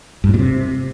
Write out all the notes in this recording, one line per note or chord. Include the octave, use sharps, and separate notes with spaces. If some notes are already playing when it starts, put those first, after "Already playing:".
G2
A2
A#2
C3